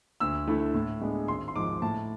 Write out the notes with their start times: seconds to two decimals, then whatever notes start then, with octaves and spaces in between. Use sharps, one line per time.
0.20 D2 E6
0.47 D3 A3 E4
0.74 A2
1.01 G#3 B3 D4
1.28 G#1 C6
1.48 C6
1.55 G#2 F3 D6
1.82 A2 A5